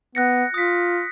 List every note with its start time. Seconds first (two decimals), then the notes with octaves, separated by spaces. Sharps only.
0.15 B3 F#6 A#6 C#7
0.54 F4 D#6 B6